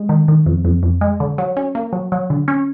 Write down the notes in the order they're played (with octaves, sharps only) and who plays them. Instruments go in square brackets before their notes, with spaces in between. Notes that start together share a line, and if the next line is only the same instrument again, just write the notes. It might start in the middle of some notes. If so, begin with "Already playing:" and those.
Already playing: [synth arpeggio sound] G#3
D#3
D#3
F2
F2
F2
G#3
D3
F#3
C#4
A#3
F#3
F#3
D3
C#4